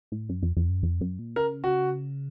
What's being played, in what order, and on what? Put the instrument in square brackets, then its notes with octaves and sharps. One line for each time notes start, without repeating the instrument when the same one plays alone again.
[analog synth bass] A2
F#2
F2
F2
F#2
F2
F#2
A#2
[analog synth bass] C#3 [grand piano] A#4
[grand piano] F#4